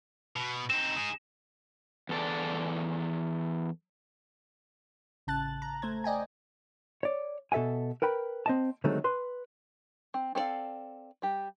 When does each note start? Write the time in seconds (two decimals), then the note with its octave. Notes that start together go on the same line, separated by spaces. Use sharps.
0.36 B2
0.70 C4 D#4 E7
0.97 D#4 G#4
2.09 E2 A4 D5
5.27 A1 C#3 A5 F#6 A6
5.62 A#5
5.82 A3 C5 G#6
6.04 D5 D#5 G5 G#5
7.03 C#5 D5
7.52 B2 A4 E5 F#5 G#5
8.02 A#4 B4 G5 B5
8.46 C4 D#5 A5
8.84 D3 D#3 F#3 G#3 A3 C4
9.04 B4 C6
10.14 C4
10.35 C4 A4 B4 D5 F5
11.22 G3 G4